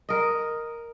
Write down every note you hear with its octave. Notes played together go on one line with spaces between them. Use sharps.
A#4 D#5